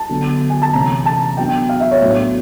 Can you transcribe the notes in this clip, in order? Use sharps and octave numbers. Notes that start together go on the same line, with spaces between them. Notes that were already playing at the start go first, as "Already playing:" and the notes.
Already playing: A5
D3 F#3 B3
G#5
A5
C3 E3 A3 C#4 A#5
A5
F#3 B3 D4 G5
F5
E5
C#5
A2 F#3 B3 D4